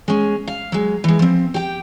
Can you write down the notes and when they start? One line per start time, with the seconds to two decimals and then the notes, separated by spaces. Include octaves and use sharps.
0.08 G#3 C#4
0.48 F5
0.72 F#3 G#3
1.04 E3 G#3
1.19 F3 C4
1.54 G4 G5